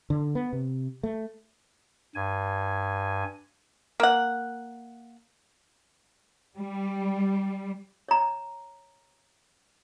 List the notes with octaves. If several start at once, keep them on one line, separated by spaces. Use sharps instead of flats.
D3
B3
C3
A3
G2 G#5
A#3 F#5
G3
C#5 A#5